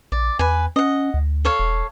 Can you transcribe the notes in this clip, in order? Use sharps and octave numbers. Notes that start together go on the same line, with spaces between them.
A#1 D5
E2 B4 G#5
C#4 D#5 F#5
D2
A4 C#5 F5
E1